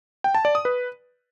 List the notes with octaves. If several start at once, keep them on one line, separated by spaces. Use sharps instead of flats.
G5
A5
D5
D#6
B4